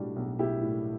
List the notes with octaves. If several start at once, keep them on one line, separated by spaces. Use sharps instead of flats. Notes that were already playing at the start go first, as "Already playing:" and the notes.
Already playing: B1 A2 G3 D4 F#4
B1
B1 E4 G4
A2